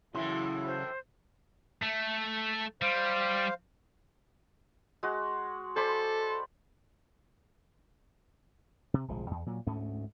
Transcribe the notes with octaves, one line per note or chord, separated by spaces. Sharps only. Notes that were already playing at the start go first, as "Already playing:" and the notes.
F#2 A2 C#3 E3 F#3 E4 C6
C5
A3
G3 C5 F5
G#3 F#4
A4 C5 D5 B5
C3
D1 B1 F3 G#3
E2
A#2 F#3
D2 G#2 A3 C#4